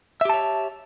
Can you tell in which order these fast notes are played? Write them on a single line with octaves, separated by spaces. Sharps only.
E5 G4 A5 C#5